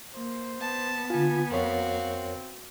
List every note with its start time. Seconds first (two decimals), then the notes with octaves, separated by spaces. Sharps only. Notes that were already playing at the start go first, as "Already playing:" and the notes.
0.15 A#3 C5
0.61 B3 A5
1.10 D3 F4 G#5
1.51 F2 C4 F#4 A#4 C#5 F5